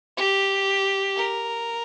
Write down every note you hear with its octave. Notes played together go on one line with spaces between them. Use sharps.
G4
A#4